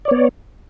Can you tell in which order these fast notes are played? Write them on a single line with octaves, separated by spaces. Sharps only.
D5 C#5 B3